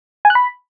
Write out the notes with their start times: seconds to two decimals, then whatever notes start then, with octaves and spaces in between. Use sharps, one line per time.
0.25 G#5
0.30 F#6
0.35 B5